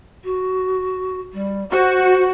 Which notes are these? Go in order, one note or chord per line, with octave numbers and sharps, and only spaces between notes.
F#4
G3
F#4 C5